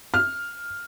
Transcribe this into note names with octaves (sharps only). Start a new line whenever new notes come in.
F6